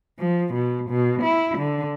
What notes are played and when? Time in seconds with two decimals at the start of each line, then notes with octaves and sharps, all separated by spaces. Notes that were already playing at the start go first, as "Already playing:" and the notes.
0.19 F3
0.53 B2
0.90 B2
1.22 E4
1.58 D3